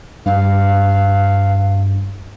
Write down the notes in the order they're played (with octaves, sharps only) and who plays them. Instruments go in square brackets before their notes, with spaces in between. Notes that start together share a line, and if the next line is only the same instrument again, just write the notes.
[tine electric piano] G2 [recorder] F5